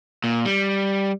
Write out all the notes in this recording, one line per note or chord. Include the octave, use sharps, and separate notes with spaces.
A#2
G3